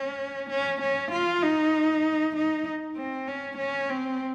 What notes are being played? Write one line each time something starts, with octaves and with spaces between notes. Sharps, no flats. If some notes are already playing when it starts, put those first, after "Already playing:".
Already playing: C#4
C#4
C#4
F4
D#4
D#4
C4
C#4
C#4
C4